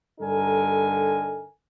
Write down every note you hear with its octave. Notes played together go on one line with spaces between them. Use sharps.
G2 D3 D#4 A4 A#4 G#5